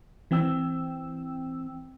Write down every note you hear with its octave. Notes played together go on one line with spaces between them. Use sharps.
E3 C4 G5 E6